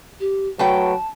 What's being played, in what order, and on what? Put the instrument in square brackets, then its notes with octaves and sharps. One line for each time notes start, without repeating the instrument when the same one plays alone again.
[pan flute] G4
[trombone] F#3 [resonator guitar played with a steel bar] A3 B4 G5 [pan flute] A5